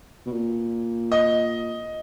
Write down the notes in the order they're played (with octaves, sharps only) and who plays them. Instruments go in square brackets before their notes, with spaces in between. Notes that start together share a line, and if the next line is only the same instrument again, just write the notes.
[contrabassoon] B2
A#2
[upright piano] D#5